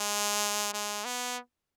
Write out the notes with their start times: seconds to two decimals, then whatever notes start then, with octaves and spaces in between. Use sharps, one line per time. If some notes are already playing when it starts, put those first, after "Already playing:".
Already playing: G#3
0.73 G#3
1.05 B3